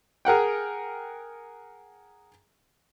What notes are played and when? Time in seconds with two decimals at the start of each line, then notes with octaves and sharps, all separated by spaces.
0.25 G#4 A#4 F#5 G5